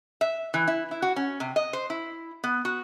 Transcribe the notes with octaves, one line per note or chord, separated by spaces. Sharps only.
E5
E3
E4
E4
F#4
C#4
C3
D#5
C5
E4
B3
F#4